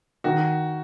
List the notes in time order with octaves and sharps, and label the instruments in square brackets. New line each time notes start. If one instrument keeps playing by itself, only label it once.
[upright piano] D#3 [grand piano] F#4